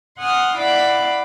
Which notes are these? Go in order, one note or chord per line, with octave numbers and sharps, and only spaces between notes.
F#5 G#5 C6 D#6 F6
E4 D5 F5 F#5 B5 D6